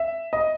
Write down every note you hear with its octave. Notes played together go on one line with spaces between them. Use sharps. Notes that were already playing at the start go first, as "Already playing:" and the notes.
Already playing: E5
D#5